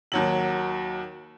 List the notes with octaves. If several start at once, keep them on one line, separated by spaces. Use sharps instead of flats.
D#2 F#3 F#7